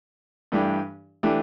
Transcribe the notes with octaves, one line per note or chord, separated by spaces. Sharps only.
G2 E3 A3 D4 G4
E3 A3 D4 G4